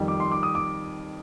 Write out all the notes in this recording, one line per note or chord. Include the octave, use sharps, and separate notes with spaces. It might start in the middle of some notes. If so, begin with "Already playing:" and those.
Already playing: F2 D#3 G3
D6
C6
D6
D#6
D6